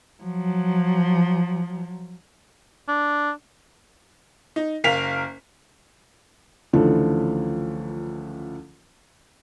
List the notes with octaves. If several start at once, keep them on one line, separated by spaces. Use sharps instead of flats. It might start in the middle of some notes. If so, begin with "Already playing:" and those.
F3 F#3
D4
D#4
F#1 A#4 F5 B6 F7
C#2 D3 E3 F3 A3